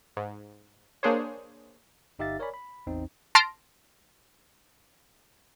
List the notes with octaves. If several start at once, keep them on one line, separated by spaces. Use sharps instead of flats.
G#2
A#3 D4 G#4 C5 C#5
G1 D#4 G4 E5 F5 A6
A#4 C#5 D5 G#5 B5
B5
A1 E2 C4 D#4
A5 C6 F6 A#6 D7